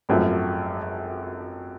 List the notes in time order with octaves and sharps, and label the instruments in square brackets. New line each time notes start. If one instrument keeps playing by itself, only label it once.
[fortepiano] G#1 F#2 F3 A3